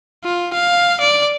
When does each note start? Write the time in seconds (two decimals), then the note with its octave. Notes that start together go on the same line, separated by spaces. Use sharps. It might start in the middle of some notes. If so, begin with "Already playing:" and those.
0.24 F4
0.53 F5
1.00 D5